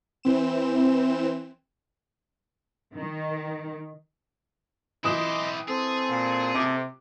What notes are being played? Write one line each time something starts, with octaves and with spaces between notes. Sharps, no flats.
E3 C4 E7
D#3
E3 E4 G4 D#5 C6 D6 D#6 E7
C4 G#4 A4
A#2
C3 D6